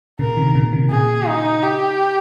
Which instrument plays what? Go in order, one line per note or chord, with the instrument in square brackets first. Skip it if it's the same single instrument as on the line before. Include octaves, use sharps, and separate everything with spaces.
[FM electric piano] A#2 C#3 [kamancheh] A#4
[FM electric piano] C3 D#3
D#3
A#2 C#3
C3 D#3
[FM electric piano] A#2 C#3 [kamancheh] G#4
[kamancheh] D#4
G4